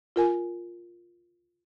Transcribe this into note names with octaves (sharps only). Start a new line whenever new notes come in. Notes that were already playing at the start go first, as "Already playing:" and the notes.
F4 A#4 G#5